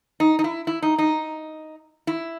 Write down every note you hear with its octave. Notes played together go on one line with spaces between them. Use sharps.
D#4
D#4
E4
E4
D#4
D#4
E4